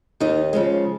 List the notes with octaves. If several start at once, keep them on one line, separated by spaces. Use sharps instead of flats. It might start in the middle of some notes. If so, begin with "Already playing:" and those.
D#2 D#4
C#3 F3 G#3